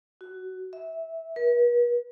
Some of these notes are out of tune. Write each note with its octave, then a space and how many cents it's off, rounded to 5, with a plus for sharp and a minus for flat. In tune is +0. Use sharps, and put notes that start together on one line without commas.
F#4 +15
E5 -15
B4 -45